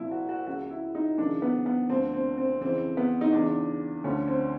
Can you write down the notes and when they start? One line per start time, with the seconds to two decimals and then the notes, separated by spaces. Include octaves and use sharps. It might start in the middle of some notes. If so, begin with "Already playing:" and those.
Already playing: C2 A#2 F3 E4
0.11 F#4
0.29 F#4
0.47 C#2 C#3 F3 F#4
0.71 E4
0.95 D#4
1.18 F#2 C#3 E3 D4
1.42 B3
1.66 B3
1.90 D2 D3 F3 C4
2.13 C4
2.38 C4
2.61 F2 C#3 E3 C4
2.97 B3
3.21 D#4
3.32 E2 C#3 E3 D4
4.04 D2 D3 F3 C#4
4.28 C4